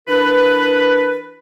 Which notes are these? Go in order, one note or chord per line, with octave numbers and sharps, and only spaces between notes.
E3 D4 A#4 B4